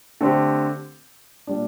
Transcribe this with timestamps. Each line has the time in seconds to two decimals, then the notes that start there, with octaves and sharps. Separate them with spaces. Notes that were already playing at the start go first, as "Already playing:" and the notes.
0.21 D3 A3 C4 G4
1.47 A#2 G3 D4